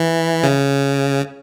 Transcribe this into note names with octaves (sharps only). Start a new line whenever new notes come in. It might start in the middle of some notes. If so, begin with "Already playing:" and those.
Already playing: E3
C#3